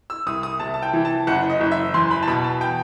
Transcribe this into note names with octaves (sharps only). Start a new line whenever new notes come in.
E6
C2 D#6
D#6
C3 A5
A5
G5
E3
A5
F#1 F#5
D#5
F#1
E5
E2 C6
B5
A5
B2 B5
A5
G5